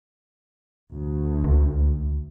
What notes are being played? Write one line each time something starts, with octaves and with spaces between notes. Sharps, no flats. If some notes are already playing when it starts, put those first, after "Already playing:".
D2
C#2